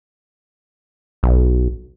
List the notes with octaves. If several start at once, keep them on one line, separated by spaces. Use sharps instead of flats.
B1